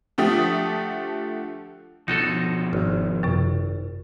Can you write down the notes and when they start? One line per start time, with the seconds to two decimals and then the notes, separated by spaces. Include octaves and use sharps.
0.18 D3 F3 A3 G4 D#6
2.08 B2 F3 D#4 F#4 A4
2.73 G#1
3.23 F#2 C3